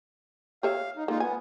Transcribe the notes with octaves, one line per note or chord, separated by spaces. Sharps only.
G4 C#5 E5 F5
D#4
G#3 A#3 D#4 F4
B3 G#5